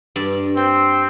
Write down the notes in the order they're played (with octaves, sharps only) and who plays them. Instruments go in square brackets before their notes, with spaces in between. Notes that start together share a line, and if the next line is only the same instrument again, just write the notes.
[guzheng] G2 D5
[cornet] C4 [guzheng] G5